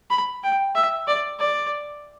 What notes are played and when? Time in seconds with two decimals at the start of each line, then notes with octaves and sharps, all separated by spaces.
0.10 B5
0.43 G5
0.75 E5
1.08 D5
1.39 D5